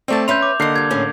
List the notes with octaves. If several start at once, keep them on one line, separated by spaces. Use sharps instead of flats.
A3 C4 D5 G5 A5
C#4 B4 C#5 E5 C6 G6 F7
D6
D3 D#3 A#3 D#5 C7
C3 G3 G#6
A2 C#4 G#4